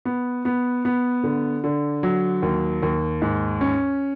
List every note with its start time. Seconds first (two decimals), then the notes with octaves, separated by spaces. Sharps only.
0.05 B3
0.45 B3
0.85 B3
1.24 D3
1.64 D3
2.03 F#3
2.42 D#2
2.83 D#2
3.22 G#2
3.61 C#4